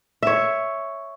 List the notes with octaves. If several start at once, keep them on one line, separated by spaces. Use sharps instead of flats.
C#5 E5